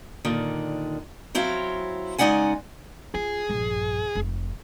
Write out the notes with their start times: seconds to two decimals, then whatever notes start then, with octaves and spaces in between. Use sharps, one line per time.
0.25 A#2 D3 D#3
1.35 F#3 C4 E4 C#5 F5
2.18 C#3 G#3 D#4 D5 F#5 G#5
3.15 F4 G#4
3.49 A#1 G2
4.15 F1